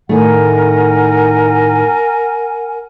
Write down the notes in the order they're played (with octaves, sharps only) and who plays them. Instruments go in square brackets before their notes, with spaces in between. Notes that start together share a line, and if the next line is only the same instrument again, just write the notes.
[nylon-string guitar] A2 D#3 A3 [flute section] A#4 F#5 G#5